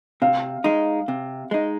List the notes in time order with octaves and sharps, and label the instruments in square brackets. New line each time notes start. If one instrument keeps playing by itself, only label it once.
[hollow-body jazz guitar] C3 [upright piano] F5
[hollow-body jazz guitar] G#3 D#4
C3
G#3 D#4